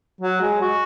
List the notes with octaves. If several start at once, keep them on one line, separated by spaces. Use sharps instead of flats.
F#3
G#3
F#4